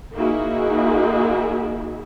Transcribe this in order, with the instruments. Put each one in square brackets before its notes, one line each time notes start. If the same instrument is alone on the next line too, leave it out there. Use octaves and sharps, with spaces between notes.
[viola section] A#3 D#4 E4 F#4 G#4